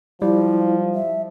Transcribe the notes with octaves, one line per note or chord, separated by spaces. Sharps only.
F3 G3 E4
E5